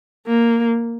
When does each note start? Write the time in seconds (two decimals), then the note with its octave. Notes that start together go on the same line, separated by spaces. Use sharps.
0.27 A#3